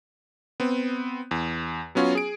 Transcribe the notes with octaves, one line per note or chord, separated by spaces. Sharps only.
B3 C4
E2
F#3 B3 C#4 F4 F#4
G#4 D7